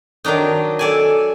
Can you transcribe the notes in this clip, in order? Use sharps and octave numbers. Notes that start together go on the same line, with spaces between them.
D#3 F#3 D4 D#4
A4 D5 G#5